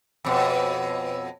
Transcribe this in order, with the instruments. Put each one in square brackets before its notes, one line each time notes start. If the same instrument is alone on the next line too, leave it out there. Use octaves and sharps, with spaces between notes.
[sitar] F2 B2 [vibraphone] C#5 B5 E6